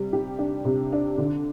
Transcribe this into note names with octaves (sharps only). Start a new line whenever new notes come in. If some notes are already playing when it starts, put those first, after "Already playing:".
Already playing: C3 G3
G4
D4
C3
D4
D3